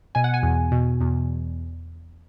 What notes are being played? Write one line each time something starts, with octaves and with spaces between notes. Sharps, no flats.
B2 G#5
F#5
G#5
E2
B2
E2